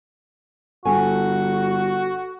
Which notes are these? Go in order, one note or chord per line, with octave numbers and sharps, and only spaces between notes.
G1 F#4 A4 G#5